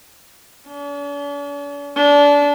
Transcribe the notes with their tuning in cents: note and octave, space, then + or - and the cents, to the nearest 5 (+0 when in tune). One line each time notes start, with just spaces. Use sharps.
D4 -45
D4 -25